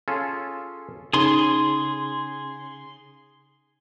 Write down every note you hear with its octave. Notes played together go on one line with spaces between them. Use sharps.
C#4 F4 G#4 A4
C#3 D#4 G#4 A4 B5 C6